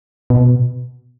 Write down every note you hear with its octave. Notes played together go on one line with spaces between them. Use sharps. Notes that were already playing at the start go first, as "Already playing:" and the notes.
B2